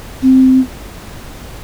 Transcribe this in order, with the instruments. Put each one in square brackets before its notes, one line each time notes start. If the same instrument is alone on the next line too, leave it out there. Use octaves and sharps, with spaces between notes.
[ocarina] C4